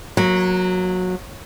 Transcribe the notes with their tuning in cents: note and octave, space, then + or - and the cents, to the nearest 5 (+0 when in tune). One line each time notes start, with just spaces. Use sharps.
F#3 -15 A#3 +5